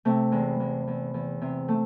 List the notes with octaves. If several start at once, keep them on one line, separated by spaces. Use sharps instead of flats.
C3 A3
E2 G#3
E2 G#3
E2
E2
C3
A3